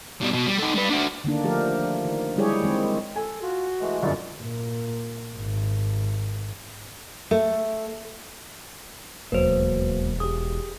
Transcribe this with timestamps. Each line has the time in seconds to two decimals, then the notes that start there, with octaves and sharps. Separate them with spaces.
0.21 B2 G3
0.33 B2
0.47 G3
0.59 D#4 A4
0.76 G3 B4
0.90 D4 F#4
1.24 D3 D#3 A#3 D4
1.44 F3 A3 G4 A#4
2.04 D#3
2.36 G3 G#3 E4 G4 G#4 C#5
2.63 D#3 G#3 C4
3.16 A4 G#5
3.42 F4 F#4
3.80 E3 G#3 A3
4.03 G1 F#2 D5
4.41 A#2
5.38 G#1
7.31 A3
9.32 E1 D#2 F#3 A#3 B4 C5
10.20 G4 G#4 D#6